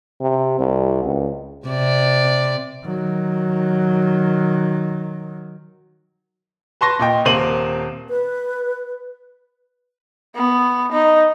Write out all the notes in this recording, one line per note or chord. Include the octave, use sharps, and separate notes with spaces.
C3
C2
C#2
C3 D5
D#3 F#3
B4 A5 C6 C#6 A#6
A#2 D#5 G5
D#1 A#3 C4 C5 D#7 F#7
B4
B3
D#4